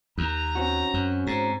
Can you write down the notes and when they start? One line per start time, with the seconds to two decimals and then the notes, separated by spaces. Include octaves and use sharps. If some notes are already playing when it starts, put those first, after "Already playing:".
0.18 D#2 A#5
0.55 C4 C#4 F#4
0.94 F#2
1.27 G#2 C5 A#5